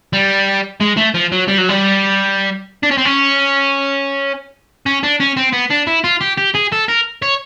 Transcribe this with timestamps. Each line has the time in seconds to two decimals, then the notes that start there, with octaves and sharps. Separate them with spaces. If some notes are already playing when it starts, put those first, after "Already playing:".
0.13 G3
0.80 G#3
0.97 A3
1.14 F3
1.32 F#3
1.48 G3
1.58 F#3
1.69 G3
2.83 D4
2.91 C#4
2.98 C4
3.05 C#4
4.86 C#4
5.03 D4
5.20 C#4
5.37 C4
5.53 B3
5.71 D4
5.87 E4
6.04 F4
6.21 G4
6.37 G4
6.55 G#4
6.72 A4
6.88 A#4
7.22 C#5